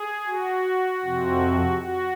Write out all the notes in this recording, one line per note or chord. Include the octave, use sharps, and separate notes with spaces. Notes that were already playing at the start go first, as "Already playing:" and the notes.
Already playing: G#4
F#4
F2 C3 F3 C4
F#4